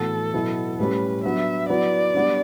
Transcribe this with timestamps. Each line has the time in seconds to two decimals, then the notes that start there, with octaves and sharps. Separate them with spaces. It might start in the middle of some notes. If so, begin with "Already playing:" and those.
Already playing: A2 E3 B3 F#4 A4
0.34 B2 F#3 B3 E4
0.79 A2 G3 C#4 B4
1.24 F#3 B3 D4 E5
1.69 F#3 B3 E4 B4 D5
2.15 G3 B3 D4